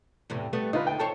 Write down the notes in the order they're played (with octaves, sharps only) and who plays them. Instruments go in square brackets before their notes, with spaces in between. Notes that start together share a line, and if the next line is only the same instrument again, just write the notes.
[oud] E2 A2 C3
G3 A3 B3
[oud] D3 [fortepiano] D#4 F4 B4
[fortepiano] G5
[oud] A4 C5 C#5 [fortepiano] A5